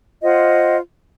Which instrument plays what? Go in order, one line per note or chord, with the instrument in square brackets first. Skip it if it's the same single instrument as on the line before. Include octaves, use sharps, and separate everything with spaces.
[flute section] F4 C5 D#5 F#5